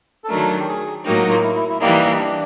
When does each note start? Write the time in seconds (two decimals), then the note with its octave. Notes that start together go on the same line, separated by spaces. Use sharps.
0.24 A4
0.29 D#3 F#3 A3 D4 A#4
0.59 G4
0.68 G#4
1.05 A2 F#3 A#3 D#4 G4
1.17 F#4
1.30 F4
1.44 E4
1.55 E4
1.69 E4
1.80 E3 G3 A#3 D#4
2.13 D#4
2.19 D4